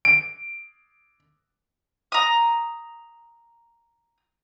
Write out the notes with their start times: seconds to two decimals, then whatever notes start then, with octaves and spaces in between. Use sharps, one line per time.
0.05 D7
2.12 A#5 D#6